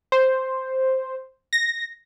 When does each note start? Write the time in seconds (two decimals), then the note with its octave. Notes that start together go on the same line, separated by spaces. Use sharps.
0.12 C5
1.53 A#6